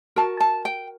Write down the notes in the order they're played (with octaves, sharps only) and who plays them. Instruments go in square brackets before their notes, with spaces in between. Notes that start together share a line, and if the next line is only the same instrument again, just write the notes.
[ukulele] F#4 A#4 A5
A5
G5